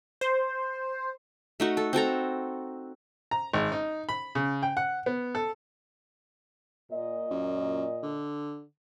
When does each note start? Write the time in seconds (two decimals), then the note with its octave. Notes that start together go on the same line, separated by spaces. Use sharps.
0.21 C5
1.60 A3 D#4 F#4
1.77 A4
1.93 C4 F#4 A4 A#5
3.31 A#5
3.53 G#1
3.72 D#4
4.09 B5
4.35 C#3
4.63 G5
4.77 F#5
5.06 B3
5.35 A4
6.91 A#2 D#5
7.31 F#2
8.03 D3